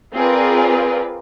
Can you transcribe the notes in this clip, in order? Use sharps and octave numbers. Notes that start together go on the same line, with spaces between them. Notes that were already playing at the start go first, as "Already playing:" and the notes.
C4 F4 G#4 A#4 B4 D5